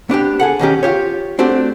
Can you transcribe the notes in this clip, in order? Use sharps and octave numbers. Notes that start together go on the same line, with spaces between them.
B3 D4 F4 G4
G#4 A4 F#5
B1 D#3 C#4 G4
F4 G4 C#5
A3 C4 D4 F#4 G4